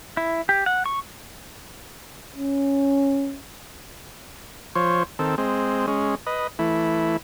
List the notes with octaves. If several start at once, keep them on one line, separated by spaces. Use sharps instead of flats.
E4
G4
F#5
C#6
C#4
F3 C5 C#5
D#3 C4 A4
G#3 C4
G#3 C#4
B4 D#5
E3 A3 E4